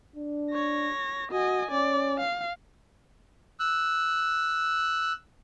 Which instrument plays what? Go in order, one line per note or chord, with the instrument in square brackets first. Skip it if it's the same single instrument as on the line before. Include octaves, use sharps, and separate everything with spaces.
[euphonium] D4
[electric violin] C#5 A#6
[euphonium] F#4 [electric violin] D#5 G#5
[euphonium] C#4 [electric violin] D5
[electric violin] F5
[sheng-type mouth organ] E6 F#6